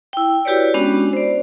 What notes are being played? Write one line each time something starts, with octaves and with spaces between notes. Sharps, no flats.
E4 G5
E4 F#4 G4 B4 C#5 D5
G#3 B3 C#4 D4 F#4
C5 D5